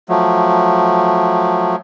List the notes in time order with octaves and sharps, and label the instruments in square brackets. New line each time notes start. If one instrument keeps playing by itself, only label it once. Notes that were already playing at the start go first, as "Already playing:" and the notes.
[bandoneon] F3 F#3 A3